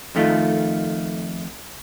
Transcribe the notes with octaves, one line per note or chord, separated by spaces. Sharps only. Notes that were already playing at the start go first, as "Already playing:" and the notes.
F2 D#3 A3 F4